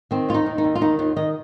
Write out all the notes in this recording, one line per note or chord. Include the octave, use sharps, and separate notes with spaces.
D#3 C4
D#2 F4
D#4
D#3
D#4
D#2
F4
D#3 D#4
D#2 F4
D#3 D#5